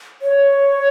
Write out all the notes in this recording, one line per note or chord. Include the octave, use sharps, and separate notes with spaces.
C#5